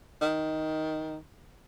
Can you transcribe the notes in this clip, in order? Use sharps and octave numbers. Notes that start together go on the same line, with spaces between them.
D#3